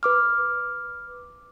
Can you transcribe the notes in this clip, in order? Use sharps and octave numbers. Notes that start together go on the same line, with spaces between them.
B4 D6 F6